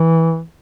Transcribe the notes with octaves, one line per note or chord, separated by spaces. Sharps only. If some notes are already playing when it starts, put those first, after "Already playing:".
Already playing: E3